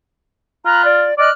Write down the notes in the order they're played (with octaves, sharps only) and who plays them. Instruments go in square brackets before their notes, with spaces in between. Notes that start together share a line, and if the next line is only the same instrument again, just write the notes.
[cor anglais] F4 [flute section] A#5 B5 F#6
[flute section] D5
[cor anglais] D5 [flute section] D#5 F6 F#6